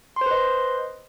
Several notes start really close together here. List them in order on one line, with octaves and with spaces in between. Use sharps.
C6 C5 B4 D#5